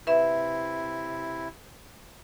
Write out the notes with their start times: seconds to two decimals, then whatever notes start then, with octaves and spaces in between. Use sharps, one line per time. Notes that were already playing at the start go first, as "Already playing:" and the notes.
0.07 C3 E4 B4 E5